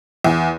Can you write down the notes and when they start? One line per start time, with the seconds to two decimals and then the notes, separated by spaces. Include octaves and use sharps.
0.24 E2